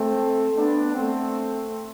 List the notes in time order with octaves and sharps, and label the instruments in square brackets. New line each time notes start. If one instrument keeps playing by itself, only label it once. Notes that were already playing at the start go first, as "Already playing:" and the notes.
Already playing: [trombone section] A3 C4
B3 D4
A3 C4